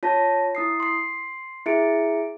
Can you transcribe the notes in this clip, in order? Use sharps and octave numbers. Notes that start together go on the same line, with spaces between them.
F4 C#5 A5 A#6
E4 D#6 C7
C6 C7
E4 G#4 E5 C#7 D7